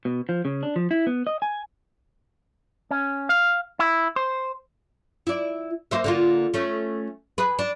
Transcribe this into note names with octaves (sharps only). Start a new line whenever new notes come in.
B2
F3
C#3
D4
F3
E4
B3
D#5
G#5
C#4
F5
E4
C5
E4 D5
A#3 C5 E5
D3 A#3 F4
A3 C#4
G#4 B4
D4